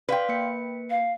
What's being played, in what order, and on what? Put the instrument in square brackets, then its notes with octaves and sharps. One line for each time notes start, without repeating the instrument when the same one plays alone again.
[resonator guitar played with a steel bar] B4 G5 [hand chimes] D5 F5 C6
[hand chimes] A#3 C#7
[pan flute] F5